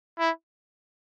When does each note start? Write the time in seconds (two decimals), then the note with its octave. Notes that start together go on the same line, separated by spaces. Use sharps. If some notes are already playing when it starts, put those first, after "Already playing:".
0.19 E4